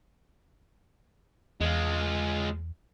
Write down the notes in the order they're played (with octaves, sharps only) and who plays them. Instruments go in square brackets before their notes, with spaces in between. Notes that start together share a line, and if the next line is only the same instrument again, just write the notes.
[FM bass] E2 [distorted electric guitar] G#3 F4